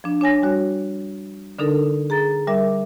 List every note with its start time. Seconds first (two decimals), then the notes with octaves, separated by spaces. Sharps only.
0.04 F3 D4
0.21 D4 C#5 G#5 A#6
0.42 G3 F#4 C#5
1.58 D3 D4 D#4 A4 A#4
2.10 G#4 A#5 A6
2.47 G3 A#4 E5 D6